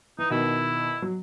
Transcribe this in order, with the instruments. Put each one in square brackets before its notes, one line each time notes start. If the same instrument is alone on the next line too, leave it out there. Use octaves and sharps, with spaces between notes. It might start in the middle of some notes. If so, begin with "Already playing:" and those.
[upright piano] E3 [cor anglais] D#4
[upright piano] B2 D#3 [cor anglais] E4
[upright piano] F#3